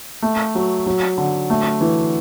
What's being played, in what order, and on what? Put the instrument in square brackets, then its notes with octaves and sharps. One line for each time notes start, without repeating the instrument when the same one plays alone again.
[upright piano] A3
F#3
F#3
D3
A3
E3